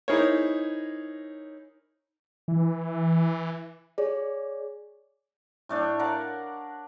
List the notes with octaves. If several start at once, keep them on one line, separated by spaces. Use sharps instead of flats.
D#4 E4 G#4 A#4 C5 C#5
E3
G#4 C#5 D5
A2 A3 D4 C#5
A#4 D5 F5 F#5